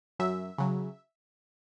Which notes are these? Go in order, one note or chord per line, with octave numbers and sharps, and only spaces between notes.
F#2 E5
C#3 F#3